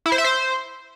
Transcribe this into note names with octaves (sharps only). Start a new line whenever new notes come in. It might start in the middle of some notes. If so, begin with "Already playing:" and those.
E4
C5
E5
C5